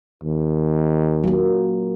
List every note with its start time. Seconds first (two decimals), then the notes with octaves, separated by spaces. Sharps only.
0.24 D#2
1.24 F#3 A#3